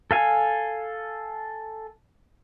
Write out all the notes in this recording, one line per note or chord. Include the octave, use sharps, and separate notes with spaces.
A4 F5 G#5